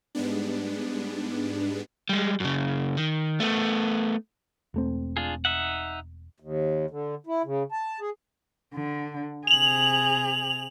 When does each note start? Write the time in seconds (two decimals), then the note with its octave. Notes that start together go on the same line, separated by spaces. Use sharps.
0.15 G#2 G3 G#3 B3 D4
2.09 G3 G#3
2.40 F#2 C#3
2.97 D#3
3.40 A3 B3
4.74 E1 A3 C4
5.17 D4 F4 G#4
5.45 D#4 E5 F#5
6.40 D#2
6.90 D3
7.27 E4
7.45 C#3
7.72 A5
8.00 G#4
8.74 D3
9.47 C3 G#4 F7 F#7